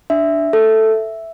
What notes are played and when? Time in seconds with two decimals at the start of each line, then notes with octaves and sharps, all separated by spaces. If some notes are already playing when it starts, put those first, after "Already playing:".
0.10 D4 E5
0.53 A4